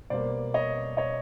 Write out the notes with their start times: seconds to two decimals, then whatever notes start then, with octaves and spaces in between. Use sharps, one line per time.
0.10 B2 G3 A#3 C5 D5
0.54 C#5 D#5
0.97 C#5 D#5